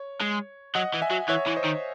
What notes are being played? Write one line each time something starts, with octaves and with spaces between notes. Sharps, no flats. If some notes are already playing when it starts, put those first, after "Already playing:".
Already playing: C#5
G#3
F#3 D#5 F#5
E3
E5 G#5
F#3
E3 C#5 E5
E3
C5 D#5
D#3